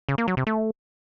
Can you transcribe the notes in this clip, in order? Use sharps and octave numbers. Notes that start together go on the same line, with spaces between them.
C#3
A#3
F#3
C3
A3